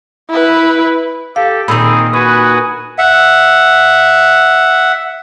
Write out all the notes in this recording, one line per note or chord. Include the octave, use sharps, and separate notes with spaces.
E4 B4
G4 A4 F5
A#2 D#3 C4 D#4 G#4 B5 E6
F#4 B4 G#5 C#6 D#6
E5 F#5